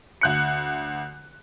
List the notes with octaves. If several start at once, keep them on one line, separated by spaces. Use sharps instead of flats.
D2 F#6 C#7